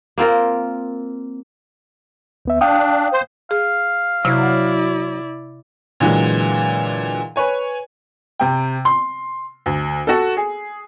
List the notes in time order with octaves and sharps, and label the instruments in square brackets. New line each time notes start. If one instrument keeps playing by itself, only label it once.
[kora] A#3 C4 F4 A#4
[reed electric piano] D2 B3 E5
[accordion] D4 [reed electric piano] F5 G5 D#6
[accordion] C5
[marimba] G#4 [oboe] F5
[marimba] C3 [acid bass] F#3 [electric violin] E4 D5
[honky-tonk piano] A#2 D3 E3 F#3 G#3
B4 C#5 G#5
[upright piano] C3 G5
C6
D2
F#4 A4
G#4